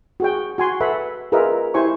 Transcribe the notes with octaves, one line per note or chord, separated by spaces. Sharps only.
F#4 G#4 G5
F#4 G#5 C6
A4 B4 E5 F#5 B5
F4 G#4 A#4 B4 D#5 E5
E4 G4 C5 G#5 C#6